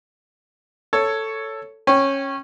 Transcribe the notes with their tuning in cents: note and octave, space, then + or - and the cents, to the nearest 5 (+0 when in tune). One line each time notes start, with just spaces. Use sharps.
A4 +5 C#5 +5
C#4 -15 G5 +0